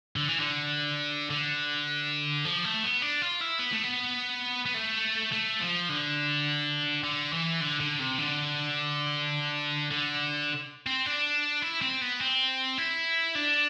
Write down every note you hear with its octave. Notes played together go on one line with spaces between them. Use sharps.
D3
E3
D3
D3
F3
A3
B3
D4
F4
E4
B3
A3
B3
B3
A3
A3
F3
D3
D3
E3
D3
D3
C3
D3
D3
C4
D4
E4
C4
B3
C4
E4
D4